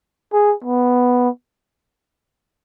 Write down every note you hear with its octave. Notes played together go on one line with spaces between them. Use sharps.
G#4
B3